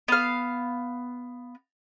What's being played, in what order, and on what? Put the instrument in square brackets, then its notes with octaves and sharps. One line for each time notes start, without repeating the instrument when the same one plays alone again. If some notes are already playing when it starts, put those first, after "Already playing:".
[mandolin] B3 F5